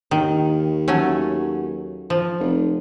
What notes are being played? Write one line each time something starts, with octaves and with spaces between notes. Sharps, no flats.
D#2 D#3
F#3 A3 C#4
F3
F1